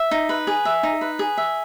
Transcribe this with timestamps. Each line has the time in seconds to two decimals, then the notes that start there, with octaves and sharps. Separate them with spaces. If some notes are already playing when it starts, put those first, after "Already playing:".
Already playing: E5
0.11 D#4
0.29 B4
0.47 G#4
0.65 E5
0.83 D#4
1.01 B4
1.19 G#4
1.37 E5